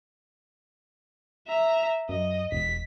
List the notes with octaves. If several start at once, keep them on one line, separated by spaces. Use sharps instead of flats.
E5 A#5
F#2 D#5
E1 B6